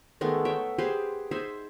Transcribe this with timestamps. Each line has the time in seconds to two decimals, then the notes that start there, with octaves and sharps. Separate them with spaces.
0.21 D#3 G#3 A3 B3
0.45 C#5 E5 G5
0.78 G4 G#4 B4 C5
1.31 D#4 G#4 C5 E5